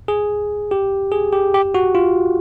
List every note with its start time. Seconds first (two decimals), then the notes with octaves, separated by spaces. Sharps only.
0.08 G#4
0.71 G4
1.12 G#4
1.32 G4
1.54 G4
1.75 F#4
1.95 F4